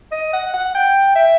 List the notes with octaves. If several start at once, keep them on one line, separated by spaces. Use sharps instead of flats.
D#5
F#5
F#5
G5
E5